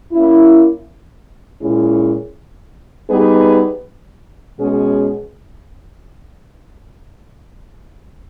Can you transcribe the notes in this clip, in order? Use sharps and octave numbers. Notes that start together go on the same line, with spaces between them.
A#3 C#4 E4
A#2 G#3 C#4 E4 G#4
G3 B3 D#4 G#4 B4
B2 G#3 C#4 G#4